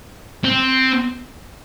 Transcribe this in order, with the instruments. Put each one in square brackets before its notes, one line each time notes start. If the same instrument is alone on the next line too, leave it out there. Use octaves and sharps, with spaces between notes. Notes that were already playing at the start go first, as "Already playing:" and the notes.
[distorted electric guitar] C4